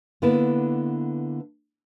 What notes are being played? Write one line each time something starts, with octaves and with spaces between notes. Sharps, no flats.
D3 A#3 B3 D4 E4 B4